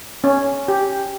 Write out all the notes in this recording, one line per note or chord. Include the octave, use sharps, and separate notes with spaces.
C#4
G4